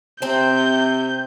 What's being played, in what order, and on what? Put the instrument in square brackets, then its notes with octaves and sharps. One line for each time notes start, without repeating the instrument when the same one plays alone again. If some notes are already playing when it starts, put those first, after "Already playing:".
[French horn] C3 [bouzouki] C4 C5 [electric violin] G6